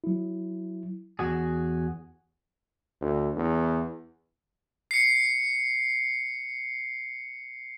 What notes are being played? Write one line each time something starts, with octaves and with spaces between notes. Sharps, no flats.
F#3 E4
E2 F#4 G#4
D2
E2
C7 C#7